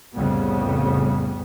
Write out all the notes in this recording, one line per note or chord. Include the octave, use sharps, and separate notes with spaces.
C2 F2 A2 C#3 G3 B3